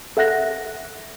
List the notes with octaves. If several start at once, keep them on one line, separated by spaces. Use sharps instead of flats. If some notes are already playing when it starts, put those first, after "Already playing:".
A4 E5 F#5 F#6 A#6